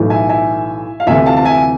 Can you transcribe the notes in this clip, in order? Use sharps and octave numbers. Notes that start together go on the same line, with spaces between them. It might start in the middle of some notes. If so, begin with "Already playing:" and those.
Already playing: B1 A2 E3
E5 G#5
E5 G#5
F5
D2 C3 E3 E5 G#5
F5 A5
A5
E5 G#5